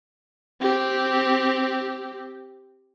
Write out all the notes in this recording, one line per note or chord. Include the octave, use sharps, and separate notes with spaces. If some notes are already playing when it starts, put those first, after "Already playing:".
C4 G4